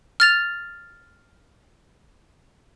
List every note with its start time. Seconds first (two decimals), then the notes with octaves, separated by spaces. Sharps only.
0.20 F6 A6 F7